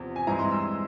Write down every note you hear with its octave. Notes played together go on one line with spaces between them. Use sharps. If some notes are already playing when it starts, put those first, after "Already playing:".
Already playing: E2 C3 F3
G#5
G2 E3 G#3 C4 E4 A#5
C6
E6